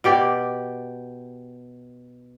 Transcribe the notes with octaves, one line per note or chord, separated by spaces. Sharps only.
B2 G4 D5